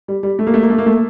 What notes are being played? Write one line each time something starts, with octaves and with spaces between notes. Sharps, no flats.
G3
G3
A3
A#3
A3
A#3
A3
A#3
A3